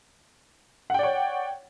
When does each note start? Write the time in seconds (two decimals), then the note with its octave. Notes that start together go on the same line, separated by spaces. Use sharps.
0.90 F#5
0.94 G5
0.99 D5
1.03 C#5